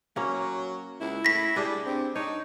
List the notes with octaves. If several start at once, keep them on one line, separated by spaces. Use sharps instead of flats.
F#3 A#3 C#4
C#2 E4
A2 A#6 B6
G3 D4 G#4
G2 C4
D4 D#4 C#5